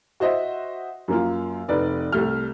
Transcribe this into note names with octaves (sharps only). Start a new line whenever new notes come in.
F#4 C5 D#5 E5
F#2 A#3 F4
F1 D#4 B4 D5
C2 A3 F6